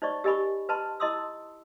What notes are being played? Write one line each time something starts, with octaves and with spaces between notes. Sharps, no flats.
D#4 C5 D5 D#5 C#6
G4 A#4 D#5 G#5 B5 C#6
B4 D#5 A5 B5 C6
E4 D#5 A5 C6 D#6 E6